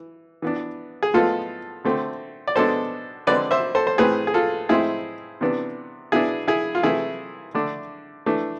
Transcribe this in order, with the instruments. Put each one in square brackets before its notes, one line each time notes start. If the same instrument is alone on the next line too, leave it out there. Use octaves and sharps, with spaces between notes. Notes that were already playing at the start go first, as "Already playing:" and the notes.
Already playing: [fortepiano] E3
E3 B3 D4
G#4
A2 F3 G#3 B3 F4 A4
D3 A3 C4
D5
B2 G#3 B3 D4 A4 C5
D3 G#3 C4 B4 D5
C5 E5
A4 C5
C5
A2 E3 A3 C4 G#4 B4
G#4
F4 A4
A2 G#3 C4 E4 G#4
C3 E3 B3 D4
B2 B3 D4 E4 G#4
E4 G#4
F4
C3 E3 A3 E4 G#4
D3 A3 D4
E3 A3 D4